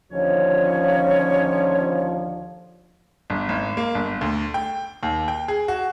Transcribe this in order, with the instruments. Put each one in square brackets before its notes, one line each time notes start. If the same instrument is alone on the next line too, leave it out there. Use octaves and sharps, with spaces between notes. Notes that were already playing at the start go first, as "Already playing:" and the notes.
[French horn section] D#2 D3 F3 [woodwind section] C#4 C#5
[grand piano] G1
G#1
A#3
G1
D2
G5
D#2
G5
G#4
F#4